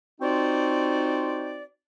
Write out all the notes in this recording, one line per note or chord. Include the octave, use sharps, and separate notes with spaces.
C4 D#4 F4 F#4 C5 D5